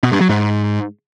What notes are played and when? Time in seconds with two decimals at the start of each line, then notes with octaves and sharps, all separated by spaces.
0.03 B2
0.12 G2
0.21 F#3
0.29 G#2